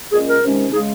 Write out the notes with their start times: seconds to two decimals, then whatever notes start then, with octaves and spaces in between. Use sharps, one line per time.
0.12 A#2 G#3 C#4 G#4
0.27 A#4
0.43 C3 D#3 G#3 C#4
0.72 C#3 G#3 D#4 G#4